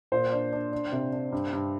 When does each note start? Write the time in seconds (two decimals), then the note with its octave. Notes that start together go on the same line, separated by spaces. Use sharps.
0.12 A#2 C5
0.32 D4
0.53 D4
0.72 D4
0.92 C3
1.13 D4
1.32 G2
1.53 G2